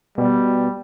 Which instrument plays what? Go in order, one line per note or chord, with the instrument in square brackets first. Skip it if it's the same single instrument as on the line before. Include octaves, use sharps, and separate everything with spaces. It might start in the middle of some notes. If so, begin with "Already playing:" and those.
[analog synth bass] B2 [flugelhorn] G3